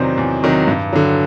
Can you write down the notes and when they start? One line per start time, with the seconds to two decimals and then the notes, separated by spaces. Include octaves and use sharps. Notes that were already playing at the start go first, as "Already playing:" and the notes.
Already playing: E2 C3 D#3 F#3 C5 D5
0.18 E2
0.43 C3 D#3 F#3
0.68 G2
0.93 D3 F#3